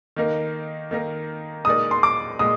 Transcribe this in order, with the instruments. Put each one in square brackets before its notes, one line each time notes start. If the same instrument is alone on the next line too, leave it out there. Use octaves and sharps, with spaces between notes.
[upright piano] D#3 A#3 D#4 A#4
D#3 A#3 D#4 A#4
[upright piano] A#2 G#3 D#4 A#4 D5 [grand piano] D#6
[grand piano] C6
D6
[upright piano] A#2 G#3 [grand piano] D#6